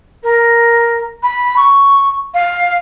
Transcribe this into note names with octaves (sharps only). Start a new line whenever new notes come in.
A#4
B5
C#6
F5